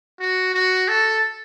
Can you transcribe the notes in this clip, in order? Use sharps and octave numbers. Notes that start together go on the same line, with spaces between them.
F#4
F#4
A4